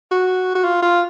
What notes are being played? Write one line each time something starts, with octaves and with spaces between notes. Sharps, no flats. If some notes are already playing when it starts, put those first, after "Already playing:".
F#4
F#4
F4
F4